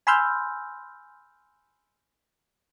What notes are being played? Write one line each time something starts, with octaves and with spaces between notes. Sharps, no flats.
G#5 B5 C6 E6 F6 G6